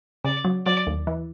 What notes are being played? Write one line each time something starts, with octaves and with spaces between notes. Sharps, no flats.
C#3 D5
F#3
F#3 D5
D#2
E3